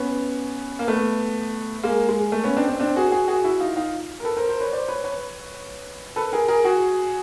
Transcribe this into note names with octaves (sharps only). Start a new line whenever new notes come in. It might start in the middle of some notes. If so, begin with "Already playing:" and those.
Already playing: B3 C#4
A#3
A3 B3
G#3 A#3
G#3
A3
B3 C#4
C4 D4
C4 D4
C4 D4
F#4 G#4
F#4 G#4
F#4 G#4
E4 F#4
D#4 F4
D#4 F4
A#4
A4 B4
A#4 C5
A#4 C5
B4 C#5
C5 D5
B4 C#5
B4 C#5
A4 B4
G#4 A#4
G#4 A#4
F#4 G#4